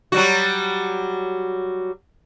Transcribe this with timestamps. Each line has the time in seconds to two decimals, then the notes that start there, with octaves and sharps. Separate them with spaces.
0.12 F#3 G3 F#4